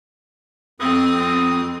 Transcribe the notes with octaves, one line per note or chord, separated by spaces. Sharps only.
F2 C4 D#6